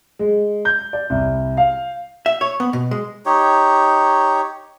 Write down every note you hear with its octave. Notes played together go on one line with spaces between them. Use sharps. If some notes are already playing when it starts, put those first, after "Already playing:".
G#3
G6
D5
C2
F5
E5
C#5
B3
B2
G#3
D#4 G4 C#5